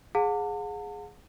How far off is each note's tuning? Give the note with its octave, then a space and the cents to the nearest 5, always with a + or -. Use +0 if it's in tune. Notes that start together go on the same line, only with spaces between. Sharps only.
G#4 +0 F#5 -40 A5 +40